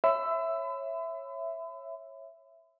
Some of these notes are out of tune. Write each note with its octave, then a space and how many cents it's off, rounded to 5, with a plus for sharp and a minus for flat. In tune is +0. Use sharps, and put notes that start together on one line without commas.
C#5 -20 E5 +5 B5 +40